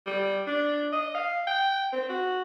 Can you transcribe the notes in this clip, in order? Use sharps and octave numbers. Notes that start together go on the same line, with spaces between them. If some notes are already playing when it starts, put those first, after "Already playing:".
G3
D4
D#5
F5
G5
C4
F#4